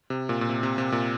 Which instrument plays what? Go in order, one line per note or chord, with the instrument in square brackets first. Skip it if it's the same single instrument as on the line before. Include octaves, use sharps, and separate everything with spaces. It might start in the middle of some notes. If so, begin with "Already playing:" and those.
[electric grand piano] C3
A#2
A#2
C3
C3
C3
A#2